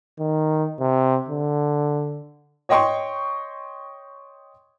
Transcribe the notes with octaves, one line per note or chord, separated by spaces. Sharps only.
D#3
C3
D3
C#5 D#5 G5 C6 C#6